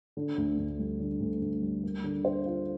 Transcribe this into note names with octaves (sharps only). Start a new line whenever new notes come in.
D3
D2
D2
G3
D3
D2
D2
G3
A#3
D3
C5
F4